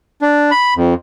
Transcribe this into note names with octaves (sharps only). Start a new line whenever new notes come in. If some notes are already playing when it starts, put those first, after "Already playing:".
D4
B5
F2